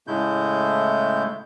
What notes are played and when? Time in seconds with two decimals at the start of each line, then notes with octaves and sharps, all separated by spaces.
0.07 A2 C#3 G#3 A3 E4 G6